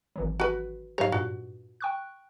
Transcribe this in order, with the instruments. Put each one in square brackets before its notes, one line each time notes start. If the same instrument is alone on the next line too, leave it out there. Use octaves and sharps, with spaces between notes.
[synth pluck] G#1 E3 F#3
[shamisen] F#4 B4
[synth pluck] G#2 F#3 G4 [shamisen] C#5 F5
[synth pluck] G2 A#2 [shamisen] F#4
[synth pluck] G5 C#6 F#6